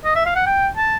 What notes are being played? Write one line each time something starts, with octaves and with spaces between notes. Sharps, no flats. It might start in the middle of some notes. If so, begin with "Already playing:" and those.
D#5
E5
F5
F#5
G5
A5